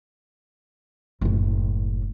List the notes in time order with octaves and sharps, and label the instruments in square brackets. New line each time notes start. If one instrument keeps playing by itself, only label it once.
[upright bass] F#1 A2